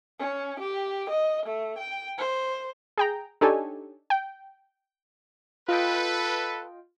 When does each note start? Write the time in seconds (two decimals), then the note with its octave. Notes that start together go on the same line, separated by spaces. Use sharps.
0.20 C#4
0.60 G4
1.10 D#5
1.46 A3
1.78 G5
2.18 C5
2.97 G#4 G5 A#5
3.41 D4 D#4 G4 A4 C#5 G#5
4.10 G5
5.68 F4 A4 B4 D#5 G5